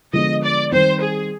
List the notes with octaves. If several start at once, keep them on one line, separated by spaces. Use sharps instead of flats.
D3 F3 G#3 B3 D#5
D5
D#3 G3 C4 C5
G#4